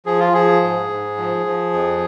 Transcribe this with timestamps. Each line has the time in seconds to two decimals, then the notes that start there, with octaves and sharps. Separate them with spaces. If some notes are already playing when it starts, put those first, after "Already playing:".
0.06 F3 G#4
0.20 F4
0.33 F3 G#4
0.62 G#2
0.90 G#2
1.17 F3
1.46 F3
1.73 F2